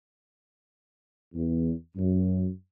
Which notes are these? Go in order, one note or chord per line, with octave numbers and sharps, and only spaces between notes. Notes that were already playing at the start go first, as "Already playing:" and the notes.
E2
F#2